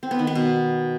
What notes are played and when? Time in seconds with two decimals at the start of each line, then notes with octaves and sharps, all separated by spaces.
0.03 C4
0.11 B3
0.19 D#3
0.27 B3
0.35 B2